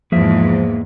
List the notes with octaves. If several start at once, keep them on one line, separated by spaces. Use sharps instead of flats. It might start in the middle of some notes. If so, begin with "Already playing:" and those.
E2 G#2 F3 A#3 G#4 E5